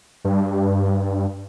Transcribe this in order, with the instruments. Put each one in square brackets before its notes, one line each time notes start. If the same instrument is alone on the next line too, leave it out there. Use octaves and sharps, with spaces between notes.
[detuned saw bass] G2